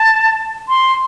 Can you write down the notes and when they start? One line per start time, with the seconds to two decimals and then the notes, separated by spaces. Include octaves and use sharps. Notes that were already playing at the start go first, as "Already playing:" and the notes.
Already playing: A5
0.69 C6